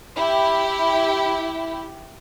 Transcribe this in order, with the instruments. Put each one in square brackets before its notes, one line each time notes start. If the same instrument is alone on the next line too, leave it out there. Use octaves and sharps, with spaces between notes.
[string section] E4 G4